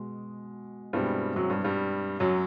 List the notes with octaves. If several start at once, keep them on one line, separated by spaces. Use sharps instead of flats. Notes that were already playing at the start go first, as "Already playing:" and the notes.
Already playing: B2 G#3
G2 B2 G3 G#3 C4 E4
F#2 F#3
G2 G3
G2 G3
F#2 F#3